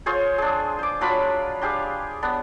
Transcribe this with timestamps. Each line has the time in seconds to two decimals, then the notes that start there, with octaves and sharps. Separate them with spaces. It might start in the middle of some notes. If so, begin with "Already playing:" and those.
0.06 F4 G#4 C5 C#5
0.38 D4 G#4
0.79 C5 D6
1.01 F#3 D4 F4 B5
1.62 D4 G4 G#4 F5
2.23 B3 D4